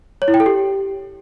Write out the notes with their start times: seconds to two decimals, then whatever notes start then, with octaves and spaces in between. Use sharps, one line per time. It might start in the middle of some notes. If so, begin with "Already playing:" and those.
0.22 C#5
0.28 E4
0.34 G5
0.40 A4
0.46 G4